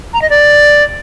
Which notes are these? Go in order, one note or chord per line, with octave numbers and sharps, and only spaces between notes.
A#5
D#5
D5